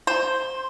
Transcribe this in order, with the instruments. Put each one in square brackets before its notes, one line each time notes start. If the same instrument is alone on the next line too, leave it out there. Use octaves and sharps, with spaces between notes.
[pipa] C5